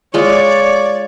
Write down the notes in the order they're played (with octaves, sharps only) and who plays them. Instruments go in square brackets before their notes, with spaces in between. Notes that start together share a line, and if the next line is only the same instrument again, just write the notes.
[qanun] G#3 F4 [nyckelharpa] C#5 [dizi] D5